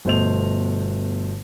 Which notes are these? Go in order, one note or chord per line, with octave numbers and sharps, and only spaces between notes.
G1 B2 A3 C5 D#5 F7